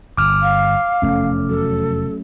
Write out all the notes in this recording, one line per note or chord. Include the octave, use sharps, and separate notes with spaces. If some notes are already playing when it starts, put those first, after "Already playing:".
G1 D6 F6
F5
F1 E2 A3 C#4
F#3 A4